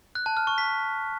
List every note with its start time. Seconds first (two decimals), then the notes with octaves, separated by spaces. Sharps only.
0.15 F#6
0.26 A5
0.37 F6
0.47 C#6
0.58 B6